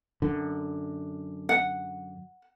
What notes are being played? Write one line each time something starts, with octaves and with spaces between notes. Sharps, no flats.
F#2 D3
F#5